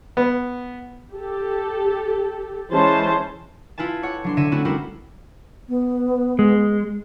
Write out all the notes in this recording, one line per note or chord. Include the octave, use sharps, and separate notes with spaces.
B3
G4 A4
E3 G#3 C#4 E4 C5 A5
E4 F4 B4 G#5 A5
G4 A4 C#5 F#5
F#3 D4 C6
D3 C#5 E5 A#6 D#7 E7
A3 C4 C#4 E4 F#4
G3 C4 E4 F#4 A#4 C5
B3
G#3